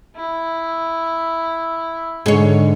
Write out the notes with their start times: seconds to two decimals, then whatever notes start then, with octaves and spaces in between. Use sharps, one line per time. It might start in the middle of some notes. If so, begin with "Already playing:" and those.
0.16 E4
2.26 G#2 D3 G#4 C#5